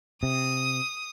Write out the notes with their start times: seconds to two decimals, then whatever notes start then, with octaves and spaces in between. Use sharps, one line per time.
0.23 C3 D#6